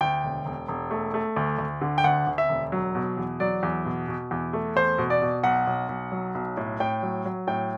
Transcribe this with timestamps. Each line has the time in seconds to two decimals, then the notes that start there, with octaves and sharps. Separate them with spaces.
0.01 D2 G5
0.23 E1
0.46 E1
0.68 E1
0.91 A3
1.14 A3
1.36 D2
1.59 D2
1.81 D3
1.98 G5
2.04 D2 F#5
2.27 D2
2.38 E5
2.49 E1
2.72 F#3
2.95 B2
3.17 E2
3.40 F#3 D5
3.63 E2
3.85 B2
4.08 B2
4.31 E2
4.53 A3
4.76 E2 C5
4.98 B2
5.10 D5
5.22 B2
5.43 B1 F#5
5.67 B1
5.89 B1
6.12 F#3
6.35 B1
6.57 A2
6.80 A2 G5
7.03 F#3
7.26 F#3
7.47 A2 G5